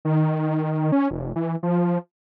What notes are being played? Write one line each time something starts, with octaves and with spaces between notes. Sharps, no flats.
D#3
C#4
F1
E3
F3